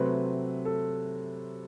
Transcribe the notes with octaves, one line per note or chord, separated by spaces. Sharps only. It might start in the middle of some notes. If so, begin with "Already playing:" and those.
Already playing: C3 F#3 A3 C4 B4
A4